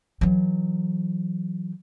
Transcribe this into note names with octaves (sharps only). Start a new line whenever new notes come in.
E3 F#3